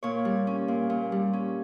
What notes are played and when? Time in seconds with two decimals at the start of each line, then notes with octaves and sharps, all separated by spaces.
0.03 A#2 C#5
0.25 G3
0.47 C#4
0.68 A#2
0.90 A#2
1.12 G3
1.33 C#4